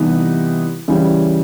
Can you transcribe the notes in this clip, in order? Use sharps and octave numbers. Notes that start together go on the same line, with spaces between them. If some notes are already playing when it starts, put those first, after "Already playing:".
Already playing: C3 E3 G3 B3 D#4
C#3 E3 G3